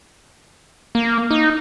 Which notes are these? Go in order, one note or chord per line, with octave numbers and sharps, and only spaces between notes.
A#3
D#4